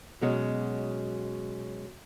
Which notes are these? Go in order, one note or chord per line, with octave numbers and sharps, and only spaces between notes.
B2 F#3 G#3 C#4